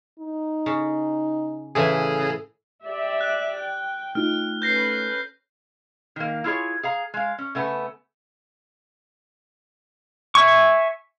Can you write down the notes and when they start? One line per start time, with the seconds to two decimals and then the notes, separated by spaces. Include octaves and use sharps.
0.19 D#4
0.66 C#3
1.75 A2 C#3 E3 E4 G#4
2.84 G4 D5 E5
3.21 F#6
3.58 G5
4.15 A3 D#4 F4 F6
4.62 C#4 A4 B4 G6 A#6 C7
6.16 D#3 A#3
6.44 E4 F4 G#4 C#5
6.83 G#4 F5 A#5
7.14 G#3 F5
7.38 C#4
7.55 C#3 A3 B3
10.35 E5 G#5 C#6